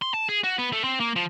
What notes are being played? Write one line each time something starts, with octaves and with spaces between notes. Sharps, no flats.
C6
A5
G#4
F#4
B3
A3
C4
A#3
F3